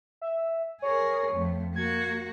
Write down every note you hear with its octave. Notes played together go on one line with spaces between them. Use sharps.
E5
G#4 A#4 C#5
F2 A3
A#3 F#4 G#6